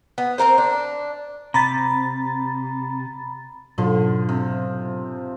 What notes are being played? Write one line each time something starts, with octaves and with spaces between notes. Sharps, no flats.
B3
C4 D#4 A#4 C5
D4
C3 A#5 B5 A6
G#2 B2 D3 F3 F#3
C3